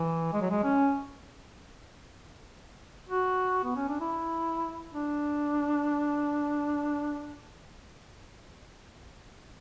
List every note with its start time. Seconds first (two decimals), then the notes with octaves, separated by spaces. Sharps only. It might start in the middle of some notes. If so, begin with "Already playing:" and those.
Already playing: E3
0.33 G#3
0.41 F#3
0.50 G#3
0.64 C#4
3.09 F#4
3.64 B3
3.76 C#4
3.88 D4
4.01 E4
4.93 D4